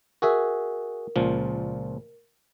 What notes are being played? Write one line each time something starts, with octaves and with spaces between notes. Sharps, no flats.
F#4 G#4 A#4 E5
C#2 A#2 F3